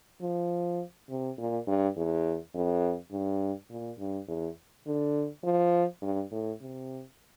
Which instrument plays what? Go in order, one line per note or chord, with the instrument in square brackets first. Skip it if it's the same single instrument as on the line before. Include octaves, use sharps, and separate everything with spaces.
[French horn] F3
C3
A#2
G2
E2
F2
G2
A#2
G2
E2
D3
F3
G2
A2
C3